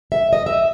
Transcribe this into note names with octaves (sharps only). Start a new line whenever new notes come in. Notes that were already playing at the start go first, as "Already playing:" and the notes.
E5
D#5
E5